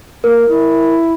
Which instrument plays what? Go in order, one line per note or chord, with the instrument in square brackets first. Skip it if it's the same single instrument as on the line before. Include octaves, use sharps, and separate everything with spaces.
[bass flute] A#3 [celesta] A#4
[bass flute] E4